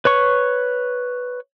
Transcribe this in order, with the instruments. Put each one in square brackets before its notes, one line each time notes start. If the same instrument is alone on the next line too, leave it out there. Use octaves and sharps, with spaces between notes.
[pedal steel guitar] B4 C#5 C#6